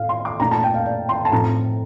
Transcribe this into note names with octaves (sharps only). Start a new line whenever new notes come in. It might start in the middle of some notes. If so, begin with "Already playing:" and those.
Already playing: A2 F5
C6
D6
A#2 A3 D#4 A#5
A5
G5
F5
D5
C6
A5
A2 F3 C4 D#4 A#5